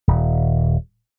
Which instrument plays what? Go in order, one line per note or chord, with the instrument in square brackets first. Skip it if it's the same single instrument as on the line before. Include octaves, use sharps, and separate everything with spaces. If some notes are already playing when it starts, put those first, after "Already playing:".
[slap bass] D#1